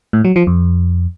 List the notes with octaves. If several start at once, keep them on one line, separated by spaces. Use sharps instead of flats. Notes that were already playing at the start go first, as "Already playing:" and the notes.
A2
F#3
F3
F2